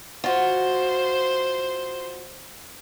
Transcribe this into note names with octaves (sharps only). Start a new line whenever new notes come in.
F4 F#4 C5